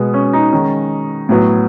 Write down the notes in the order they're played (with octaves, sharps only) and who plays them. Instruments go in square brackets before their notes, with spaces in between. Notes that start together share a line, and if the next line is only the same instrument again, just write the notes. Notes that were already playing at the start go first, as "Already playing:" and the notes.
Already playing: [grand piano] B2 G#3 B3
C#4
D#4
D#3 G#3 C#4
A2 F#3 B3